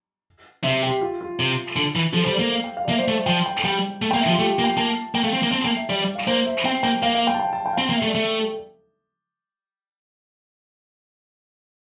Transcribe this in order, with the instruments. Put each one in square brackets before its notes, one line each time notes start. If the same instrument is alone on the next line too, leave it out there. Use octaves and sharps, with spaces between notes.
[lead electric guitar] C3 [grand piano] E5
[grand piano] G4
F4
F4
[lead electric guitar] C3
D3
E3
[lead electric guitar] F3 [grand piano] A4
[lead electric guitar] G3 [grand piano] C5
[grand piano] D5
[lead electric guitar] A#3
[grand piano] F5
G5
F5
D5
[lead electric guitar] A#3 [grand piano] E5
[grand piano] C5
D5
[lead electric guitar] A3
[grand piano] E5
[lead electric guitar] F3 [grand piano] G5
[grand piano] G5
[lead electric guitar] G3 [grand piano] G5
[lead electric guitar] A3
[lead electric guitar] A#3 [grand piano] G5
[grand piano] E5
[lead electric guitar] F3
[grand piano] F4
[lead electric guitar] A3 [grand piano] G4
[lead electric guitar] A#3
[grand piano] G5
[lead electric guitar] A#3 [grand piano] A5
[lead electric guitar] A#3 [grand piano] G5
[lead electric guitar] A3 [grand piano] F5
[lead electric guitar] C4 [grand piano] G5
[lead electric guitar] A#3
[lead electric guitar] C4 [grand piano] A5
[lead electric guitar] A#3 [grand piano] G5
[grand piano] E5
[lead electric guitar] G3 [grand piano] D5
[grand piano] D5
F5
[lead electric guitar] A#3 [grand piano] C5
[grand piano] E5
[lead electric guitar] C4 [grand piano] G5
[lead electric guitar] A#3 [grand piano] G5
[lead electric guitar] A#3 [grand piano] F5
[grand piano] F5
G5
A5
G5
A5
G5
F5
[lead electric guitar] C4 [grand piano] G5
[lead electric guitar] A#3
[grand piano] E5
[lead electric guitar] A3
[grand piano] D5
[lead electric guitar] A3 [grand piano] E5
[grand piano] A4